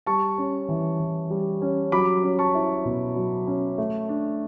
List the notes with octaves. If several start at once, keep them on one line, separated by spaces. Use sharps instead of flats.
G3 A5 C#6
C#4
E3
E3
G3
C#4
F#3 B5 D6
C#4
A5 C#6
E4
B2
F#3
C#4
A3
D4